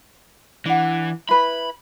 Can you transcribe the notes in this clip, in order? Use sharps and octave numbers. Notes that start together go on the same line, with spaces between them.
E3 D4 F#5
E4 B4 B5